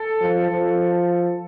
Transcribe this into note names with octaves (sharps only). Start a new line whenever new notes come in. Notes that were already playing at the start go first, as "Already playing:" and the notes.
Already playing: A4
F3
F3